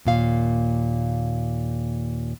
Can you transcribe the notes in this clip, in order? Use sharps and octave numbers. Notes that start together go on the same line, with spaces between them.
D#2 A#2 F5